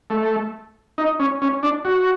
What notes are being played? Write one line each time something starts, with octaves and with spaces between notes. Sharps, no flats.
A3
D#4
C#4
C#4
D4
F#4